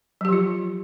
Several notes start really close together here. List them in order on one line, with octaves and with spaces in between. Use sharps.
F#3 G4 F3 F4